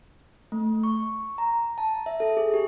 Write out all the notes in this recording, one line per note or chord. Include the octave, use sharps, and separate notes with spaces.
A3
C#6
A#5
A5
E5
A4
G#4
G4